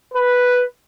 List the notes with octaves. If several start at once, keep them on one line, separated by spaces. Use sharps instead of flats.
B4